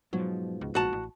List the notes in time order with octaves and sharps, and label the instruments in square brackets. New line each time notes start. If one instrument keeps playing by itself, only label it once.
[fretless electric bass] G#2 B2 F3 [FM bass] F#3
[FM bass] C#2
[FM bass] A#1 [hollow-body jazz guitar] F#4 A5
[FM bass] A1